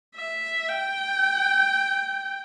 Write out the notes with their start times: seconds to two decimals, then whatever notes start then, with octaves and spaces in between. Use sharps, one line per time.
0.16 E5
0.68 G5